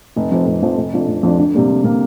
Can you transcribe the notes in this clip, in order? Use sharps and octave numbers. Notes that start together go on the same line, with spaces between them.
F1
F2 F3 C4
F1
F2 F3 C4
F1
F2 F3 D4
F1
F2 F3 D4
D2
C3 G3 A#3
D2
C3 G3 A#3